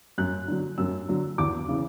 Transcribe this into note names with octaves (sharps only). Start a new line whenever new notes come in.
F#2 F#6
D3 F#3
F#2 E6
D3 F#3
E2 D6
C#3 E3